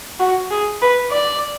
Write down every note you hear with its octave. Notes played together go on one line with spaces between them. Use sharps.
F#4
G#4
B4
D5